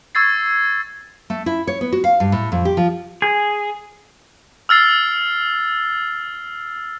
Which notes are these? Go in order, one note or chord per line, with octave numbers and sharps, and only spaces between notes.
C#6 E6 G#6 A6 C7
A3
E4
C#5
B3
F#4
F5
G2
A2
F2
G4
F3
G#4
E6 F6 A6 C7